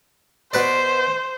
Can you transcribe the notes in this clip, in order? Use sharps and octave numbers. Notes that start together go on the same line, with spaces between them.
B2 B4 C5 D5